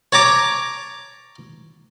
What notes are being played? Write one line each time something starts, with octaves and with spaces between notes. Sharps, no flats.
C#5 A5 A#5 D6